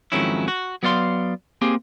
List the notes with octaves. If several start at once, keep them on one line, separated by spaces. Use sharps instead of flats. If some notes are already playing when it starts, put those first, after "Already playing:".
F2 G#2 D#3 F#3 C#4 E4
F#4
F#3 B3 D5 F5 C6
A#3 C4 G4 G#4